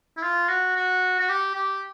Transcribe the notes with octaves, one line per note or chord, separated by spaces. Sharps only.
E4
F4
F#4
F#4
F#4
G4
G4